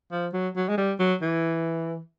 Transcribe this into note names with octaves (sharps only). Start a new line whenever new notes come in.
F3
F#3
F#3
G#3
G3
F#3
E3